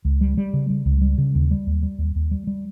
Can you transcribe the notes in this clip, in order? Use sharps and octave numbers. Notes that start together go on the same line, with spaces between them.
C#2
G3
G3
C#3
G3
C#2
G3
C#3
D#2
G3
D#2
G3
D#2
D#2
G3
G3